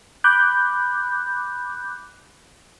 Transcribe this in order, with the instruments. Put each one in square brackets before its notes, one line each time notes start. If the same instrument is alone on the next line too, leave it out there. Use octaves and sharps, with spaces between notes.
[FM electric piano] B5 D6 F#6 G6